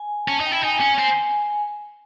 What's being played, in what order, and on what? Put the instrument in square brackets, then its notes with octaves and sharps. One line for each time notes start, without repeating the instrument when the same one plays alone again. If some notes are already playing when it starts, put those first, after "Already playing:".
Already playing: [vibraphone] G#5
[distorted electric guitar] C#4 [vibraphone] A5
[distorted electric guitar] D#4
[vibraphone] G5
[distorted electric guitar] E4
[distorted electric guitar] D#4 [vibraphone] G#5
[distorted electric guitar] C#4
C4